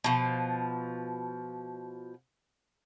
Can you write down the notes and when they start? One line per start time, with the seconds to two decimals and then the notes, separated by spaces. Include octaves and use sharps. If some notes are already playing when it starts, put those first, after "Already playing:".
0.04 B2 F3